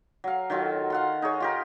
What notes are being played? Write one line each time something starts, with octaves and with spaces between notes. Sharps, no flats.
F#3 F5
D#3 F#3 F4 A4
F5 F#5 C6
D#4 G#4 C#5
F4 G4 A#4